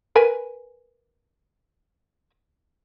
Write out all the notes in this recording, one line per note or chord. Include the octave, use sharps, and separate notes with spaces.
A#4 B4 G#5